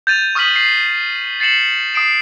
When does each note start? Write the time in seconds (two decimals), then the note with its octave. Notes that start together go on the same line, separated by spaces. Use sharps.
0.07 G6 A6 D#7 F7
0.35 C#6 D#6 F6 G6 B6 F#7
0.56 C7
1.40 A6 C7 C#7 E7 F#7
1.94 D#6 C7 D7 E7